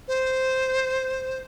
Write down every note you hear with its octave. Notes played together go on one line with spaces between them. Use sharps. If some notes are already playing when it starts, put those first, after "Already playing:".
C5